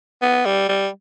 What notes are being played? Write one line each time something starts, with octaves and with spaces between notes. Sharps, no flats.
B3
G3
G3